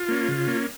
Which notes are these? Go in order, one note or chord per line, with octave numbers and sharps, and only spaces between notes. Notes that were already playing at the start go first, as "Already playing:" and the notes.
Already playing: F4
A#3 C#4
C#3
A#3 C#4